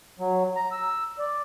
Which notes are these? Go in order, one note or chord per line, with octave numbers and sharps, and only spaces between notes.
F#3
A#5
E6
D5